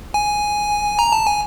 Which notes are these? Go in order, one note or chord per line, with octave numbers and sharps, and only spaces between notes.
G#5
A#5
A5
G#5